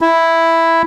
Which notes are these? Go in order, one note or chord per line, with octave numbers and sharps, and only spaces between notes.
E4